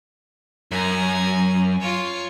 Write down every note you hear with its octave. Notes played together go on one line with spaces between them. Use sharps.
F#2 G#5 A#5
F4 C#5